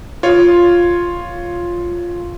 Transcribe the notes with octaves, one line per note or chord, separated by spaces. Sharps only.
F4 C#5